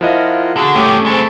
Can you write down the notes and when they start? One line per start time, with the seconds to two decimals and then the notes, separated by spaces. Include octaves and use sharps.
0.01 F3 E4 F4 A#4 D#5 F#5
0.56 D3 F#4 G#4 E6
0.75 G2 A3 C#4 G4 D6 D#6
1.06 G#3 C4 A5 B5 C#6